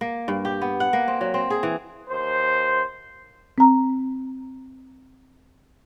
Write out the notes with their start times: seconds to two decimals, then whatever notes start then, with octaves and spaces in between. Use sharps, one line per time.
0.01 A#3
0.28 G2
0.45 G4
0.62 B3
0.80 F#5
0.93 A#3
1.08 C4
1.21 F#3
1.34 C4
1.50 G#4
1.63 E3
2.09 D#2 C5
3.58 C4 A#5